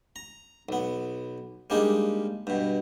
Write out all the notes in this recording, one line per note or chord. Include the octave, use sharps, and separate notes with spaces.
A#5
B1 B3
G3 G#3 A#3 D4 D#4 G#4
G2 B2